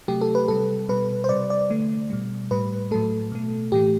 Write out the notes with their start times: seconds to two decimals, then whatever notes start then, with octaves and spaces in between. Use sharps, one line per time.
0.08 C3 F#3 A3 G4
0.21 A4
0.35 B4
0.48 C3 G3 A4
0.89 B2 G3 B4
1.24 C5
1.29 C3 G3 D5
1.50 D5
1.70 D3 A3
2.10 B2 G3
2.51 A2 G3 B4
2.91 A2 F#3 A3 A4
3.32 B2 A3
3.72 A2 E3 A3 G4